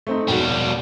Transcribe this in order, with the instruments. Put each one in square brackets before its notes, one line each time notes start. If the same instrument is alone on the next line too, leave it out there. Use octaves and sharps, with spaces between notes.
[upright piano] A3 C4 D#4
[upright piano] E1 F#4 [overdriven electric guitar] B2 G3